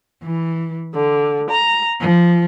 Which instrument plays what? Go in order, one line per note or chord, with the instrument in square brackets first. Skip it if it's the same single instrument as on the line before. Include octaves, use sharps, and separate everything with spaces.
[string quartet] E3
D3
A#5
F3